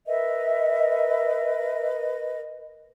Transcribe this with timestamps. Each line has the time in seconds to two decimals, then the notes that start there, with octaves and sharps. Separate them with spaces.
0.07 A#4 B4 D#5 E5